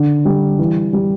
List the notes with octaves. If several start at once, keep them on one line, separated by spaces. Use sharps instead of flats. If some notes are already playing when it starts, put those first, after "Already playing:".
Already playing: D3
G3
E3
G3